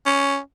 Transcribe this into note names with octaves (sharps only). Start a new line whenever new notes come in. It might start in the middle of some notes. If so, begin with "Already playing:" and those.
C#4